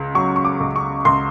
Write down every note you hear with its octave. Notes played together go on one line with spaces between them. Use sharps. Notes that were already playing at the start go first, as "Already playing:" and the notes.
Already playing: C#2 C#3
F#3 C#6
C#6
D6
C#2
C#6
C#2 C6